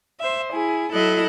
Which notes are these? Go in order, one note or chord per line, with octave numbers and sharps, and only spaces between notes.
C5 E5
E4 G#4
F#3 E4 A4 D#5 F#6